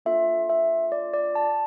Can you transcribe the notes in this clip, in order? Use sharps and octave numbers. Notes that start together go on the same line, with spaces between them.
A#3 D4 F4 A4 E5
E5
D5
D5
A5